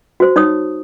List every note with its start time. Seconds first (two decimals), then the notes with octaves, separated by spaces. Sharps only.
0.20 F#4 C5
0.36 D#4 C#5 D#6